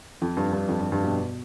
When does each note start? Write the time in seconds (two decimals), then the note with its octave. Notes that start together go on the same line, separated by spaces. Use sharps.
0.21 F2
0.37 G2
0.53 G2
0.68 F2
0.80 G2
0.92 G2
1.04 B2